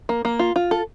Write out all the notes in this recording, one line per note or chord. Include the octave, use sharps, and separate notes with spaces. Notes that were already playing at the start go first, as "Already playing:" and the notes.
A#3
A#3
F4
F4
A4